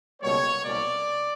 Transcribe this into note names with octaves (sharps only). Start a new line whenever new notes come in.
C#2 B2 G3 A#3 C#5
C2 B2 G3 A#3 C#4 D5